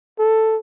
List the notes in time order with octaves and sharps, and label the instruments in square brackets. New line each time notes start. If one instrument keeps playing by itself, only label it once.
[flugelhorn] A4